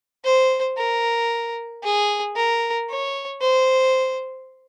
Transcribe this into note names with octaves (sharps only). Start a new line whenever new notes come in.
C5
A#4
G#4
A#4
C#5
C5